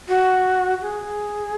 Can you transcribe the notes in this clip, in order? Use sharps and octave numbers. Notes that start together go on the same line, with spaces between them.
F#4
G#4